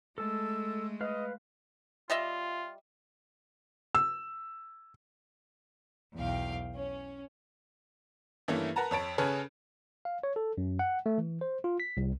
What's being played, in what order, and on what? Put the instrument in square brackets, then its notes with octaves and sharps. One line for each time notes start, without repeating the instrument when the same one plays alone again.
[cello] G#3 A3 [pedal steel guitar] A4 A5 [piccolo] E6
[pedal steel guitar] B4 F5 F6 [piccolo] D#5
[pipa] G3 D#5 E5 [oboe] F4
[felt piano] E6
[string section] B1 E2 F5 G5
C#4
[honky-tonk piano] G2 E3 A3 A#3 C#4 E4
A#4 B4 F#5 A5 A#5
F2 C#5 A5 D7
C#3 C#4 G#4 A4 B4 C#5
[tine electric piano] F5
C#5
A4
F#2
F#5
A3
E3
C5
F4
B6
C2